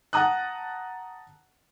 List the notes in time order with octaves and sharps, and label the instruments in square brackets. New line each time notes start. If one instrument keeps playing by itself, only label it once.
[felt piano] F#5 A5 A#5 D#6 F#6